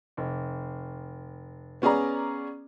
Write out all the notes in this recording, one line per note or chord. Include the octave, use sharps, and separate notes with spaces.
F1
B3 C#4 G#4 D5 A#5